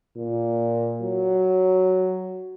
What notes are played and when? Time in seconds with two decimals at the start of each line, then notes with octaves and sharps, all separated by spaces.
0.16 A#2
1.02 F#3